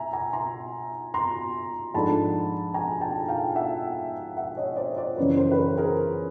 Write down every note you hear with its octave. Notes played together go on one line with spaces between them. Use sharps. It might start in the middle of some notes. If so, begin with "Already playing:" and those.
Already playing: E5 G#5 A#5
G#5 A#5
A#5 C6
A#5 C6
G#2 F3 A3 D4 A5 B5
G#5 A#5
G5 A5
F5 G5
E5 F#5
E5 F#5
C#5 D#5
C5 D5
C5 D5
F#2 C#3 E3 B4 C#5
A#4 C5
B4
A#4 C5
G#4 A#4